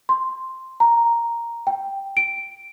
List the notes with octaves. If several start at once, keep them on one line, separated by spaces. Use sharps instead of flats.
C6
A#5
G5
D7